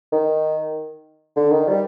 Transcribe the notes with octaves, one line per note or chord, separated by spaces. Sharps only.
D#3
D3
D#3
G3